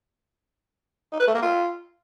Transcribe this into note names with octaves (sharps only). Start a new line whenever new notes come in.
D#4
B4
A3
A#3
F4